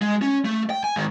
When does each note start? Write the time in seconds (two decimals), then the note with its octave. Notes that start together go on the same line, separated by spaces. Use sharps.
0.02 G#3
0.22 C#4
0.45 A3
0.70 G5
0.84 G#5
0.96 G#2 D#3